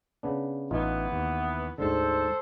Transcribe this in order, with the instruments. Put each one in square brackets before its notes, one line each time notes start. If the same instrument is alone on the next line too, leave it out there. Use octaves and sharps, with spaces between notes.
[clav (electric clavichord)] C#3 B3 D4
[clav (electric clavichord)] A1 D#4 F4 [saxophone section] E3 B3
[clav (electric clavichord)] D#2
[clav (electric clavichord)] D2 G#2 D3 [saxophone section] A4 C5